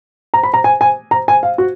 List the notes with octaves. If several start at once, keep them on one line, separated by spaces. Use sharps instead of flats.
A#5
B5
A#5
G#5
G#5
A#5
G#5
F5
F#4